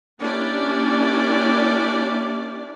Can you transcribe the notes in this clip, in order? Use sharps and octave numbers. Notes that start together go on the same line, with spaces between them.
A#3 C#4 D4 E4 G4 D5